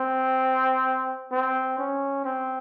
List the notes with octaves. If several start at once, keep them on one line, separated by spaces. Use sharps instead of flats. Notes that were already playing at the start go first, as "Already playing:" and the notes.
Already playing: C4
C4
C#4
C4